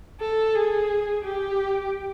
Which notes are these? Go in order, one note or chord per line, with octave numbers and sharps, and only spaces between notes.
A4
G#4
G4